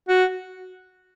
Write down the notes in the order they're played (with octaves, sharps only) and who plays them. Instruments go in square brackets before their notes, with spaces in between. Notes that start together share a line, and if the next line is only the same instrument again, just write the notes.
[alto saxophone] F#4